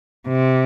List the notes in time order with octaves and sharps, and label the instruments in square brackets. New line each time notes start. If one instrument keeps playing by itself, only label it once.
[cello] C3